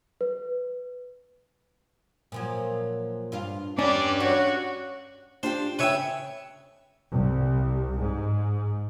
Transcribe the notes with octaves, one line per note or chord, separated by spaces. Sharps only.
B4
A#2 F3 F#3
G2 D4 F4
E2 C#4 D4 G4 D5
F#4 C#5
D4 F4 G4 C5
C#3 B4 C#5 E5 G5
C2
G#2